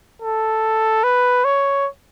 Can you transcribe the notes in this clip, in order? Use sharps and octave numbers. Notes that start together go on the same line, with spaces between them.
A4
B4
C#5